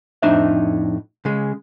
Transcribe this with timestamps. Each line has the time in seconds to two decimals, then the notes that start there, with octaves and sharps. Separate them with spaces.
0.22 F2 A2 D4 D#4 C5 E5
1.25 C#3 G#3